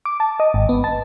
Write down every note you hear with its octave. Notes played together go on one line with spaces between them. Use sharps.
D6
A5
D#5
G#1
B3
A5